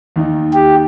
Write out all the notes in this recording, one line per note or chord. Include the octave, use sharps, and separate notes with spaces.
D#2 D#3 D#4
G4